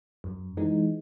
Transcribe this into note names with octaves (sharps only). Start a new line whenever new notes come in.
F#2
E3 G#3 D#4